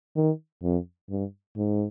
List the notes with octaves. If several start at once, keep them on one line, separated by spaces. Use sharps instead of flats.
D#3
F2
G2
G#2